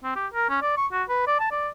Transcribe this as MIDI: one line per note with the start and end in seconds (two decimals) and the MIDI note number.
0.04 0.15 60
0.16 0.27 67
0.34 0.49 70
0.49 0.58 61
0.62 0.76 74
0.77 0.87 85
0.92 1.03 66
1.09 1.24 71
1.27 1.36 74
1.40 1.48 81
1.52 1.69 74